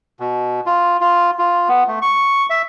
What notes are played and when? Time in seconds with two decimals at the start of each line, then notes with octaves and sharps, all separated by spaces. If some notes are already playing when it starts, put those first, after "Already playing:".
0.20 B2
0.66 F4
1.01 F4
1.39 F4
1.69 B3
1.87 A3
2.02 C#6
2.50 E5